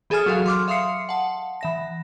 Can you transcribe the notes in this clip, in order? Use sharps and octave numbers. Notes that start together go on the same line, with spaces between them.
E3 G#4 A4 G#5 D#6 F6
F#3 F#4 A4 F5
C6 D6 F6
E5 F5 C6 D#6 C7 C#7
F#5 A5
E3 E5 A#6